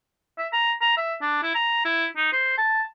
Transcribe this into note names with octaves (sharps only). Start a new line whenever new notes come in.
E5
A#5
A#5
E5
D4
E4
A#5
E4
D#4
C5
A5